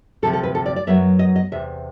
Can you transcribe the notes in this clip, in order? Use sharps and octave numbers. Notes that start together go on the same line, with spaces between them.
D2 C3 F3 A4
A4
B4
A4
D5
D5
F#2 D#3 F#3 B3 E5
D#5
D#5
E2 C3 E5